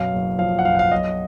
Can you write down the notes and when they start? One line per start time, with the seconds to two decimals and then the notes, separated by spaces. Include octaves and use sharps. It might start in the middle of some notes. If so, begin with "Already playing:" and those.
Already playing: F#2 B2 F5
0.13 F#1
0.39 F3 F5
0.59 F#5
0.65 F#2 F5
0.75 F#5
0.79 F5
0.92 B1 D#5